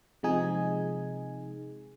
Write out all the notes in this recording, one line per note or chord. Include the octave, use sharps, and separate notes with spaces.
C3 F3 G#3 D#4 G#4 G#5